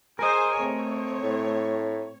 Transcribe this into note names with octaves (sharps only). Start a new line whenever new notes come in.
G#4 A#4 C5 D#5 G#5
A3 C4 C#5
A2